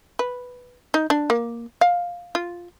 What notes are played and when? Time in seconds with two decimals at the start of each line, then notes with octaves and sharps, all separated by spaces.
0.19 B4
0.94 D#4
1.10 D4
1.30 A#3
1.81 F5
2.35 F4